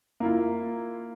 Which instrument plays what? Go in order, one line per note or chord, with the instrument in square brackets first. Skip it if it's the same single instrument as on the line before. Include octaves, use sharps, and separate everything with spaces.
[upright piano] A#3 E4 F4